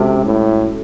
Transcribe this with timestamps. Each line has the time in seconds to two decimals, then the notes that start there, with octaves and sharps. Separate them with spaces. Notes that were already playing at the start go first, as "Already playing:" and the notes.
Already playing: C3 G#3 C#4 F#4 A4
0.24 A2